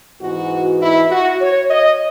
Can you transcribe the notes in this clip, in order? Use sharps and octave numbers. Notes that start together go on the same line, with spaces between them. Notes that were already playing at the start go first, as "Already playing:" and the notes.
G#2 E3 B3 F#4
E4
F#4
C#5
D#5